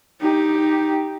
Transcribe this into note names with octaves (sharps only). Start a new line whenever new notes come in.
D#4 G4